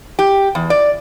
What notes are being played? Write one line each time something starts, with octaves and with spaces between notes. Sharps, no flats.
G4
E2
D5